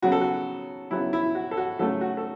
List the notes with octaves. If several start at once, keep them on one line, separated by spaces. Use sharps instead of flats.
C#3 F#3 B3 F#4
A4
F#4
C#3 F#3 B3 E4
E4
F#4
A4
F#4
C#3 F#3 A3 A4
F#4
A4